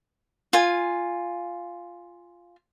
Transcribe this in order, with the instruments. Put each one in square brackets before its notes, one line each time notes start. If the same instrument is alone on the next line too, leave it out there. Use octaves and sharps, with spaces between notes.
[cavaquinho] F4 G#5